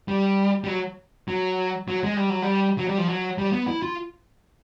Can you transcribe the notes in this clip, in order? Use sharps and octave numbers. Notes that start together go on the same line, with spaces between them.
G3
G3
F#3
F#3
F#3
G#3
G3
F#3
G3
F#3
G3
F3
F#3
G3
B3
E4
F4